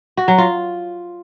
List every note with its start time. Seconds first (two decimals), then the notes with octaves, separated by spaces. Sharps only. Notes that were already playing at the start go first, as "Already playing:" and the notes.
0.17 F#4
0.28 F#3
0.38 F4